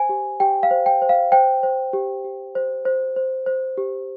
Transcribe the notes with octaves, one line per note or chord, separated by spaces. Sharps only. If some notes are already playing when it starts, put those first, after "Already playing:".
Already playing: C5 G#5
G4
G4 G5
F5
C5
G5
C5
F5
C5 G5
C5
G4
G4
C5
C5
C5
C5
G4